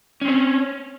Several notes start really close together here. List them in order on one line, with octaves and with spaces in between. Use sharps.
C#4 C4 C#5